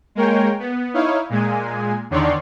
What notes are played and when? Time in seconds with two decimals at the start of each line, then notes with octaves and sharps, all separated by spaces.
0.15 G#3 A#3 A#4 C#5 G5
0.59 B3
0.94 D#4 E4 C#5 F5
1.30 A#2 G#3 G#5
2.10 E2 D3 D#3 C#5 D5 C6